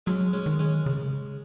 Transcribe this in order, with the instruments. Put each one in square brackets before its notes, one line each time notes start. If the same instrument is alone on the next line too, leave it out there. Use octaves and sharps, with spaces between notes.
[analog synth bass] F#3 [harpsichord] G#3 C#4
[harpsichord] G#3 C#4
[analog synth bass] D#3
[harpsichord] G#3 C#4
[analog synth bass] C#3